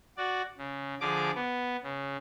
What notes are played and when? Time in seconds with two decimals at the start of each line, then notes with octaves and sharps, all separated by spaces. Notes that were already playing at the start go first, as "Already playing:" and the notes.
0.17 F#4 D5
0.58 C#3
1.01 D3 F3 G#4 D6
1.35 B3
1.83 C#3